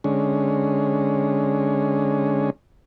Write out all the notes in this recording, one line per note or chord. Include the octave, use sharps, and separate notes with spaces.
D3 G#3 C#4